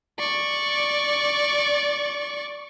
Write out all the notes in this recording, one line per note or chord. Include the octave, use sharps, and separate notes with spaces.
D5 C#6